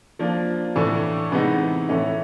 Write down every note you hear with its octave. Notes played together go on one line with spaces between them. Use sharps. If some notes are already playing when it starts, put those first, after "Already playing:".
F3 A#3 D4
A2 E3 A3 D4
C3 E3 G#3 B3 D#4
A2 E3 A3 C#4 E4